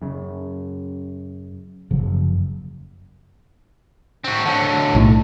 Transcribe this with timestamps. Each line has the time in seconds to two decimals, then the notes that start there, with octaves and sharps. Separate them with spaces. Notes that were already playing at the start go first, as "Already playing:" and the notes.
0.02 F#2 C#3
1.91 F#1 C#3 F3 F#3
4.24 C4 F#4
4.46 D3 F#3
4.95 B1 A2